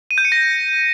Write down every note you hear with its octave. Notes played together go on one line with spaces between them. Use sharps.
D#7
G6
C#7
A#6